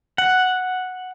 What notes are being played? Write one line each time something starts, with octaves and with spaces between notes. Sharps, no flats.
F#5